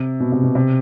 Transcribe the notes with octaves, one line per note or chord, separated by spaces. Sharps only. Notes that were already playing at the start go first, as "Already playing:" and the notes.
Already playing: C3
B2
C3
B2
C3